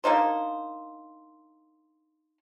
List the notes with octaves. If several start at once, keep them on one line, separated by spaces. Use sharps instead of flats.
A#3 D4 D#4 C5